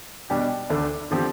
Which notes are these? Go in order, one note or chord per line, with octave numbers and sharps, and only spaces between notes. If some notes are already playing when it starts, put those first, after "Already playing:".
B2 G3 D4 G4
D2 D3 A3 D4
D3 F3 C4 G4